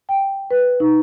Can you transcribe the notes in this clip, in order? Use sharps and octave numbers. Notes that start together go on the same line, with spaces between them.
G5
B4
D#4